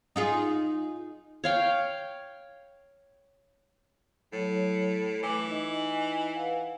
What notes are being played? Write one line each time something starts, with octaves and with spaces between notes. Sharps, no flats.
D#4 F4 G#4
C#5 F5 G5
A2 F#3 E4 C#5
E3 A3 D6
D#4 E4 D#5
B4 F5 F#5